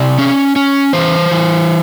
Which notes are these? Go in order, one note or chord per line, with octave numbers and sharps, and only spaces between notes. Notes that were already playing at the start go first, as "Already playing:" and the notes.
Already playing: C3 D5
C#4
C#4
E3 C5
E3